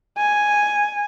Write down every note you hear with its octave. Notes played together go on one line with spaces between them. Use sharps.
G#5